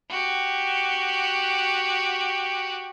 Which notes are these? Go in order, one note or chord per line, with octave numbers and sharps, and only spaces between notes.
F#4 G4